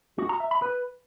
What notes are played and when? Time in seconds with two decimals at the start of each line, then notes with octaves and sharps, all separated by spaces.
0.18 F#4
0.29 A#5
0.40 E5
0.51 B5
0.62 B4